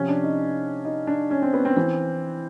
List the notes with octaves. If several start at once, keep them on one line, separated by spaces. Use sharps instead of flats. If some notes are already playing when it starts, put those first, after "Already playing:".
Already playing: C3 F3 C#4
D4
D#4
D#4
D4
C#4
C4
B3
C4
E3 C4